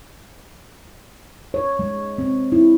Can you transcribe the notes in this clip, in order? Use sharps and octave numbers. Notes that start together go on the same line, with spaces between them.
C#5
G#3
C4
E4